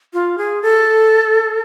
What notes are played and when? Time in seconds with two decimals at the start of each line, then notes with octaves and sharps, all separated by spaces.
0.13 F4
0.38 G#4
0.62 A4